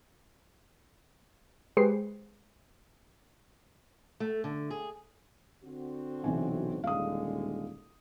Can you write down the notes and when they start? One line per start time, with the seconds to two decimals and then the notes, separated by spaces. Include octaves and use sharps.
1.77 G#3 G4 G#4 B4 C5 C7
4.20 A3
4.44 D3
4.70 G#4
5.64 D3 C4 F#4
6.24 B1 C3 E3 G#5
6.84 D#1 D3 G#3 F5 D#6